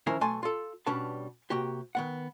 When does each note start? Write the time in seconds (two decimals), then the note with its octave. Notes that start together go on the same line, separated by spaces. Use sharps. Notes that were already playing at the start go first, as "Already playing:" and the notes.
0.07 D#3 F3 C#4 E4 A#4 C5
0.21 B1 A3 G#5 A5 C6
0.43 F4 A4
0.86 B2 G3 C#4 D4 B4 A5
1.50 C3 A#3 F#4 G4
1.95 D#3 B3 F#5